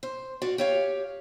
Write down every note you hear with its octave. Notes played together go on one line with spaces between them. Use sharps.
C5
F#4 D5 F5
G4 C#5 F5